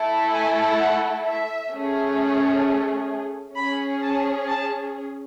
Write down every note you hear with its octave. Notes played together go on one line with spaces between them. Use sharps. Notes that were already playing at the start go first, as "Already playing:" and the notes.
Already playing: A3 E4 A4
G#5
F#5
E5
A3 C#4 G#4
C#4 G#4 B5
A5
A5